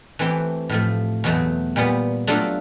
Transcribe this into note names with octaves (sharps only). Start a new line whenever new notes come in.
E3 A3 C4 E4 G4
A2 F3 A3
E2 B2 F#3 A3
A#2 G3 B3
F#3 A3 D4 F4 A4